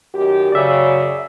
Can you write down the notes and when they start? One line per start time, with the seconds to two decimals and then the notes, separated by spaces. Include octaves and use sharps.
0.14 F#2 D#3 G4
0.52 F#2 C#3 D5 E5